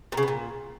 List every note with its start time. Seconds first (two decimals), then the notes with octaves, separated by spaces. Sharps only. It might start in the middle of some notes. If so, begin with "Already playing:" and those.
0.12 A#2
0.17 C#3
0.23 B3
0.28 A#2